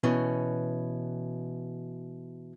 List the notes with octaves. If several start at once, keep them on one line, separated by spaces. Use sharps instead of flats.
B2 E3 C#4